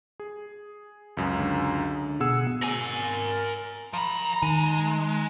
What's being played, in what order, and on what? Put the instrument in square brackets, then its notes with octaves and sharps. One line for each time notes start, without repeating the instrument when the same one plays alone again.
[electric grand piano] G#4
C#2 F#2
[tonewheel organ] D3
[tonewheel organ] B2 F#5 [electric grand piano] G#4 E6
[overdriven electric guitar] A#4 G#5
[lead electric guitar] F3 B5 [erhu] A#5
[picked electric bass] D#3 [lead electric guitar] G#3